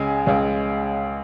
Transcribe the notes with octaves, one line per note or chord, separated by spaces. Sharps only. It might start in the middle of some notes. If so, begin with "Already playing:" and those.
Already playing: C#2 C#3 G#3 G#5
C#2 C#3 G#3